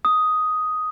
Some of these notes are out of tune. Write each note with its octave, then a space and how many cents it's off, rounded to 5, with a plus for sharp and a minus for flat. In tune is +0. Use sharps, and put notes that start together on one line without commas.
D#6 +5